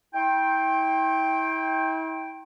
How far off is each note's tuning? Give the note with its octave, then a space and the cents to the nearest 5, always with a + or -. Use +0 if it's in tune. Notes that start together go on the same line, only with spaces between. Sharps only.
E4 -35 G5 +0 C6 +40